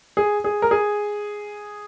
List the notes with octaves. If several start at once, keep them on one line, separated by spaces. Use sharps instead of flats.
G#4
G#4
A#4
G#4